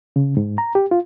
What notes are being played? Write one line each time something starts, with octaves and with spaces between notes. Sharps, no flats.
C#3
G#2
A#5
G4
F4